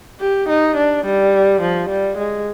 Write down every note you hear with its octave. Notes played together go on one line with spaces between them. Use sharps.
G4
D#4
D4
G3
F3
G3
G#3